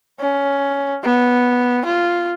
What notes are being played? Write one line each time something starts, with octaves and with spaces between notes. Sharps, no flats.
C#4
B3
F4